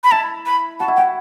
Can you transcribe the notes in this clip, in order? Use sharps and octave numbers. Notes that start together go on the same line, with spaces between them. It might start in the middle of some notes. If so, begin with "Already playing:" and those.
B5
E4 A5
B5
F#4 A5
E4
F#4 G5